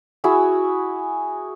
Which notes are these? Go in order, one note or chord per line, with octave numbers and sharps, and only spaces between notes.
E4 F#4 G#4 E6